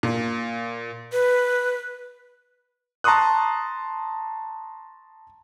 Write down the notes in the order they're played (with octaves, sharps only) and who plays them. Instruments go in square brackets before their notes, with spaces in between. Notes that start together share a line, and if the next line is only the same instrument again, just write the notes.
[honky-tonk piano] A#2
[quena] B4
[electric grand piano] A5 A#5 C6 C#6 D#6 F#6